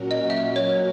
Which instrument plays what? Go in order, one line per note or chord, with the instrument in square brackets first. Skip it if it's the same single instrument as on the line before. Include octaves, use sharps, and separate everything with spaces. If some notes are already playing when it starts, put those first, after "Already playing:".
Already playing: [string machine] A#2 F#3 C#4 F#4 A#4
[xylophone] D#5
E5
C#5